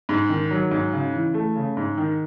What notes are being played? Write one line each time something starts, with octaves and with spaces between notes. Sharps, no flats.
G#2
D#3
F#3
G#2
C#3
E3
A3
C#3
G#2
D#3